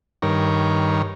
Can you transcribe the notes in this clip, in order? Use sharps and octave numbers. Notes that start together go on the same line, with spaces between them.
G2 D#3 A#4 C#5